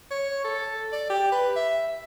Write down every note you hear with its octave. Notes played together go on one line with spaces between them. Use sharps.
C#5
A4
D5
G4
B4
E5